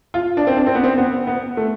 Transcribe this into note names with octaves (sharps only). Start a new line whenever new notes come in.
F4
D4
C4
D4
C4
B3
C4
B3
B3
A3